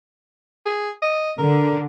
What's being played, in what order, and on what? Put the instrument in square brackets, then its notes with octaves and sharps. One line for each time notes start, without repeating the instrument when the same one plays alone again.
[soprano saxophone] G#4
D#5
[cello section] D3 [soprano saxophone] A#4